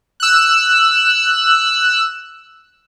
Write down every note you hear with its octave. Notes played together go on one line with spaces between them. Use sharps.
E6 F#6